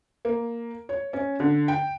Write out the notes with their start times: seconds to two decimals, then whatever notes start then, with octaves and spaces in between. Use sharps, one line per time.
0.25 A#3
0.89 C#5
1.13 C#4
1.40 D3
1.68 G5